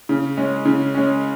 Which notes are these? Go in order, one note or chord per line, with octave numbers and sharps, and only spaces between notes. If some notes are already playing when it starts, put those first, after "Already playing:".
C#3
G#3 C#4
C#3
G#3 C#4